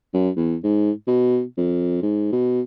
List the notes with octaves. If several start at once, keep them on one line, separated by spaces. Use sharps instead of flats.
F#2
E2
G#2
B2
F2
G#2
B2